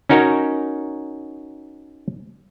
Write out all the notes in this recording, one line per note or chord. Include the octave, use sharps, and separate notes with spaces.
C#4 D#4 F#4 A#4 C#5